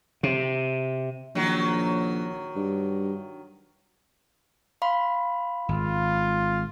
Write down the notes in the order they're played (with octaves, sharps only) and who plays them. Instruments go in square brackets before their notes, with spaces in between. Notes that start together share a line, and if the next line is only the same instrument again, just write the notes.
[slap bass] C3
[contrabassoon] A#1 [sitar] D#3 F#3
[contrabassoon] G2
[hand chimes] F5 B5 C6
[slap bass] G#1 [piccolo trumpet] F4